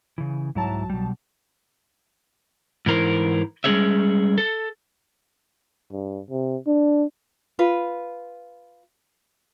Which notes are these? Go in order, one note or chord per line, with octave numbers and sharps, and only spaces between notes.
C#3 E3
C2 G#2 F#3 E4 A5 A#5
B2 G3
G#2 E3 A#4 C5
G3 G#3 C#4 G#4 C#5 E5
A4
G2
C3
D4
F4 B4